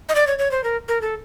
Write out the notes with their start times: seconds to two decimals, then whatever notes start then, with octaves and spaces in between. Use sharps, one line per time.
0.09 D#5
0.15 D5
0.27 C#5
0.39 C#5
0.51 C5
0.64 A#4
0.88 A#4
1.01 A4